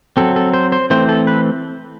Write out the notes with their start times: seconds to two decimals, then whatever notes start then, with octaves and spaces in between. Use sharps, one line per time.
0.17 F#3 C4 A4
0.36 A4
0.54 C5
0.72 C5
0.90 E3 A3 C4 C5
1.09 A4
1.27 B4